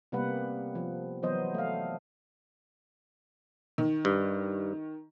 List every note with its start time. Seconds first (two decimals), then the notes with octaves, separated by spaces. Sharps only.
0.12 C3 G3 A#3 B3 B4 F#5
0.75 F3
1.23 E3 F#3 B3 C5 D#5
1.54 A3 F5
3.78 D#3
4.05 G2